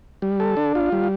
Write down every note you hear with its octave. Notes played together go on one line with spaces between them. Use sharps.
G3
A4
D4
F4
G3